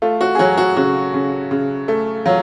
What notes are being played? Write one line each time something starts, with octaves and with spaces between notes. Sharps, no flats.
A3 F4
F#4
G#4
F#3 F#4
F#4
C#3 F#4
C#3
C#3
A3
F#3 F4